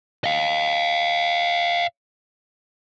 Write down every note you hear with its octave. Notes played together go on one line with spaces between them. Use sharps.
D#5 F5